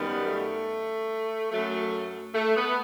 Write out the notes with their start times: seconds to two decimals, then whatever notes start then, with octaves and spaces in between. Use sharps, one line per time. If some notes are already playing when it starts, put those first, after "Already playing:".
Already playing: F#2 D#3 G3 B3
0.27 A3
1.52 F#2 F#3 A3
2.35 A3
2.56 B3